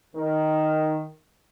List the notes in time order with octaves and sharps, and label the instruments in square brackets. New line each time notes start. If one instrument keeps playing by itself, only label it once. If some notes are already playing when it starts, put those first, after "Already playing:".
[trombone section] D#3